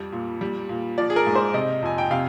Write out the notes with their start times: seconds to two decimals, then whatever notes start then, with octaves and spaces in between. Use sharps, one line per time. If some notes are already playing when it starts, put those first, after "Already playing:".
Already playing: F2 G3
0.12 A#2
0.41 G3
0.69 A#2
0.98 F3 D5
1.10 G#4
1.16 A#4
1.27 G#2
1.35 C5
1.54 C3 D#5
1.82 F2 G#5
1.98 G5
2.11 C3 F5